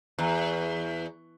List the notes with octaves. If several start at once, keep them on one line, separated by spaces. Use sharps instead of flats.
E2